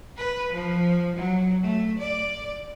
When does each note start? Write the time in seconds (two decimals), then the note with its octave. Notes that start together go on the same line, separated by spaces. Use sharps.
0.16 B4
0.52 F3
1.16 F#3
1.65 A3
1.99 D5